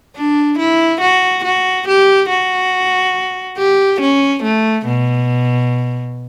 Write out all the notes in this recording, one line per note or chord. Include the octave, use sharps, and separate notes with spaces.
D4
E4
F#4
F#4
G4
F#4
G4
C#4
A3
B2